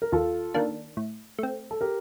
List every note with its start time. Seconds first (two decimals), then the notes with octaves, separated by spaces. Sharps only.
0.02 A#4
0.12 D#2 F4 A4
0.54 D#3 A#3 D4
0.97 A2
1.39 A3 C4
1.71 A4
1.81 G4 A#4